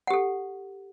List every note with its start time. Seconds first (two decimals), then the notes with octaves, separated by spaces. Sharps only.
0.07 F#5
0.10 G4
0.13 A4